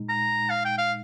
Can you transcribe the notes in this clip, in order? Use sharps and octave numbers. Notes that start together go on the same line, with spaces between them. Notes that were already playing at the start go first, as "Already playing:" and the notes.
Already playing: A#2 G#3 D#4
A#5
F5
G5
F5